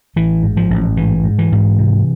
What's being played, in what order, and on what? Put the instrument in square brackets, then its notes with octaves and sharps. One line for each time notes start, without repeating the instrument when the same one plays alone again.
[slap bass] A1 E3
G#2
F3
A1
G#2 E3
G#2
E3
G#2
C3